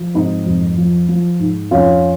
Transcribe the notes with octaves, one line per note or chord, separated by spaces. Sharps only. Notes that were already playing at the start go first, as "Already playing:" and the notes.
Already playing: F3
G#2 C4 D#4
F2
F3
F3
G#2
F2 C#4 F4